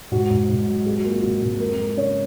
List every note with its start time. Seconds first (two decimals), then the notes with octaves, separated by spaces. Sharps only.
0.12 G#2 F#4
0.30 G#2
0.49 G#2
0.67 F#3
0.86 G#1 G#4
0.97 F#4
1.05 A#3
1.10 F4
1.22 G#1 F#4
1.42 G#2
1.60 F2 A#4
1.79 F2
1.97 C#3 C#5